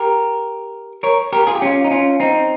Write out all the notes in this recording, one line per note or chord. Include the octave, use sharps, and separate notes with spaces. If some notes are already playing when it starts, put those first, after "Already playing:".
Already playing: G4 A#4
A#4 C#5
G4 A#4
F4 G#4
G4
C#4 F4
D#4
C#4 F4
C4 D#4